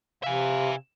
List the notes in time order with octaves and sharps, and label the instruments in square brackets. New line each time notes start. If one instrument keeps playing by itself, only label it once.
[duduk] C3 [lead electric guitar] E5 G#5 [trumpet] F5